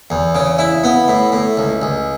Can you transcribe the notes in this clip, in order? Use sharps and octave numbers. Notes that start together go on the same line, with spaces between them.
E2
C#3
E4
B3
A2
A2
C#2
C#2